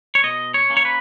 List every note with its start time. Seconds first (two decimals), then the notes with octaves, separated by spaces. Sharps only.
0.15 C#5
0.23 B2 D#5
0.54 C#5
0.70 A#3 C#4
0.77 C#5
0.85 B4